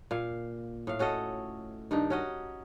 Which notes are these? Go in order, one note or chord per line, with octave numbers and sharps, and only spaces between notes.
A#2 F5
A2 F5
C#4 F#4 A4 D#5
G2 D#3 D4 D#4
C#4 F#4 D#5